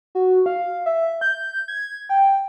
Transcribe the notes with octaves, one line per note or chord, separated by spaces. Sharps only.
F#4
F5
E5
G6
G#6
G5